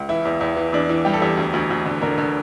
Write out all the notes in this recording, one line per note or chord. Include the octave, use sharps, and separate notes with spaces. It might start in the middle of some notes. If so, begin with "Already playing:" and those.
Already playing: C#2
E3 E4
E2
E2 E4
E3
E2 D4
E3
G3 G4
A4
E2 G4
D2
D2
D2
D3
D3 A#4
D3